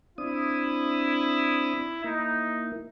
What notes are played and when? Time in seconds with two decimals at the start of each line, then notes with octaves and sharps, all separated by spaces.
0.18 C4 D4 E4 D#6
2.04 A#3 D#4 E4